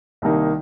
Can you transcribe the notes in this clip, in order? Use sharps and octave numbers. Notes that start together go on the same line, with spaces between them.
C2 C3 D#3 A#3 D#4